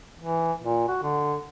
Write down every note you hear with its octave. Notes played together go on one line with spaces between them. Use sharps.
E3
A#2
F#4
D3